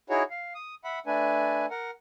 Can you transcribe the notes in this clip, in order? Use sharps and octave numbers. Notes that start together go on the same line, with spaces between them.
D#4 E4 F#4 G#4 C#5
F5
D#6
E5 F#5 B5
A3 D4 B4 G#5
A#4 F#5